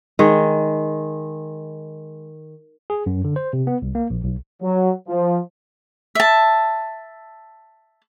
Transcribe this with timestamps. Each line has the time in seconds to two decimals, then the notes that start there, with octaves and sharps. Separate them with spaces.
0.19 D#3 G#3
2.90 G#4
3.06 F#2
3.24 D3
3.36 C5
3.53 C3
3.67 B3
3.82 C2
3.95 A#3
4.10 A#1
4.24 B1
4.62 F#3
5.08 F3
6.15 E5 A5